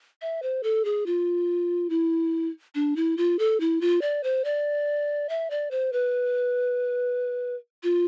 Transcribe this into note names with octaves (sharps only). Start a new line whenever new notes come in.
E5
C5
A4
G#4
F4
E4
D4
E4
F4
A4
E4
F4
D5
C5
D5
E5
D5
C5
B4
F4